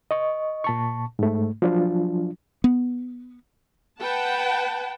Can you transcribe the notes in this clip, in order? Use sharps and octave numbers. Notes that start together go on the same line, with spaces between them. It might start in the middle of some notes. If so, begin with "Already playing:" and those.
D#5 C#6
A#2 A5 C#6
G#2 A3
F3 F#3 D4 F4
B3
B4 F#5 G5 A5